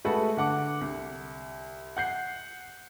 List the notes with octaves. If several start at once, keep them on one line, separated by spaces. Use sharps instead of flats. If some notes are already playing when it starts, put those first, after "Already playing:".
G#3 A3 F#4 A4 B4 F#5
D3 F#5 D6
C2
F#5 G6 C7